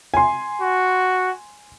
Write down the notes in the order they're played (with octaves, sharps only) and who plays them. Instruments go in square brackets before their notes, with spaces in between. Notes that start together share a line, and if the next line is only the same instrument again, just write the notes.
[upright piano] G#5 C6
[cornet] F#4